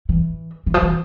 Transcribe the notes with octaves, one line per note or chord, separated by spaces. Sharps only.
E3
E3
F3
E3